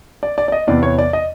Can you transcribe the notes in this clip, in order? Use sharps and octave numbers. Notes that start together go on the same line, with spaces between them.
D5
D5
D5
D#5
E2 C3 E3 D5
C#5
D5
D#5